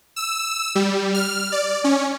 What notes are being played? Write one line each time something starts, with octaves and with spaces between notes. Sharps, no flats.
E6
G3
F6
D5
C#4